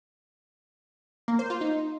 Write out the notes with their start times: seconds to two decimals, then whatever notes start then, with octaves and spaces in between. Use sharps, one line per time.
1.28 A#3
1.39 C5
1.50 F4
1.61 D#4